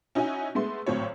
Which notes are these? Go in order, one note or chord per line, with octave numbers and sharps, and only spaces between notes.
C#4 D#4 E4 F#4 G#5
G#3 A3 B3 C6
G#1 A2 F#3 C5 C#5